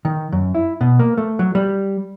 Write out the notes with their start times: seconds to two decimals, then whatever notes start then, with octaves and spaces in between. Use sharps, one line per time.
0.05 D#3
0.32 F#2
0.55 E4
0.81 B2
0.99 A#3
1.17 A3
1.39 F#3
1.55 G3